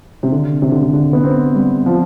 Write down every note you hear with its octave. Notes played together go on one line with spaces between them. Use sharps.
C3
D3
C3
D3
C3
D3
B3
C4
G3
F3